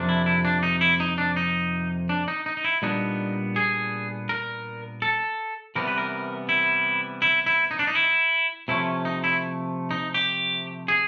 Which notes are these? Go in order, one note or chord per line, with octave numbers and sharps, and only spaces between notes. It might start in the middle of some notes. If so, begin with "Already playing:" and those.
Already playing: F2 C3 F3 A#3 D4
E4
E4
D4
D#4
E4
D#4
D4
D#4
D4
D#4
D#4
D#4
E4
A#2 G3 B3 D4 D#4
G#4
A#4
A4
C3 E3 G3 B3 A#4
B4
A#4
E4
E4
E4
D#4
D4
D#4
E4
C3 F3 A3 C#4 E4
D#4
E4
D#4
G4
G#4